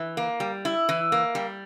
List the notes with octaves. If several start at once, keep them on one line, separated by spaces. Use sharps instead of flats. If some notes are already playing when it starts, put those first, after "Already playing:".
Already playing: E3
A#3
G3
E4
E3
A#3
G3